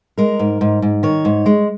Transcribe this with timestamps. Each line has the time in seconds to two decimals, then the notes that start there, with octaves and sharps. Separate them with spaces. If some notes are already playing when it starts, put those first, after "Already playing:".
0.18 G#3 A#4
0.39 G#2
0.61 G#2
0.82 G#2
1.03 D#3 C#5
1.25 G#2
1.46 G#3